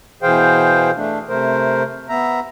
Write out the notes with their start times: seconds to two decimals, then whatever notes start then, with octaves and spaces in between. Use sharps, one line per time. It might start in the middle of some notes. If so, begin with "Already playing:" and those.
0.23 B2 E3 G#4 C5 F5 G5
0.97 A3 D4
1.29 C3 A3 A#4 C5
2.09 B3 E5 A#5